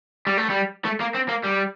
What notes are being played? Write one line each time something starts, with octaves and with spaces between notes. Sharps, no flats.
G3
A3
G3
A3
A#3
C4
A#3
G3